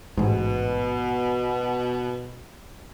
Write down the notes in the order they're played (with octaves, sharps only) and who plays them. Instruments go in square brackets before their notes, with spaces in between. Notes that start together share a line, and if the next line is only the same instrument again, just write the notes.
[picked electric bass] A1 G#2 [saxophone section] B2